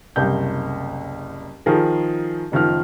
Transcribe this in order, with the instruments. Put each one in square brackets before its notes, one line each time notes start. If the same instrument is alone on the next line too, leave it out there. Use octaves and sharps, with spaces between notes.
[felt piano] F#1 C2 G6
D#3 F3 G#4 A#4
F#1 D#3 F3 F6